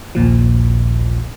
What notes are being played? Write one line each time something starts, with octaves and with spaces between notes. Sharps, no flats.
A#1 D#2 A#2 F3